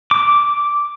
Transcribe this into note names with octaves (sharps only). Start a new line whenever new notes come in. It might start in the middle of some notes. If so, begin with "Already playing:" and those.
D6